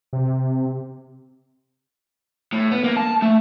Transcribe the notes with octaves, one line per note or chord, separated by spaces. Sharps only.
C3
A2
B3
A#3
A5
A3